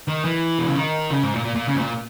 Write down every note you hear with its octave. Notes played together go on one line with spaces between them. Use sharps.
D#3
E3
B2
C#3
D#3
C#3
G#2
A#2
A#2
A#2
C#3
G#2
A#2